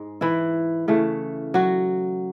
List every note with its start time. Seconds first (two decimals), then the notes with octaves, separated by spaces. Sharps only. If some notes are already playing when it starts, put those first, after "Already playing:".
Already playing: G#2 G#3
0.21 E3 E4
0.88 C#3 E3 A3
1.54 F#3 F#4